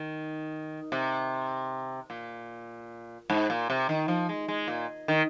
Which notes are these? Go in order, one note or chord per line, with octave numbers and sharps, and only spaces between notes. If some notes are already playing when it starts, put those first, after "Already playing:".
Already playing: D#3
C3
A#2
G#2
A#2
C3
D#3
F3
G#3
G#3
A#2
D#3